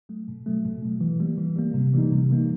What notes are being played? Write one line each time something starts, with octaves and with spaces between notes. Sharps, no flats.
F#3 A3
B2
F#3 A3
B2
F#3 A3
E3
G3 A#3
E3
G3 A#3
C3
E3 G3 A#3 D#4
C3
E3 G3 A#3 D#4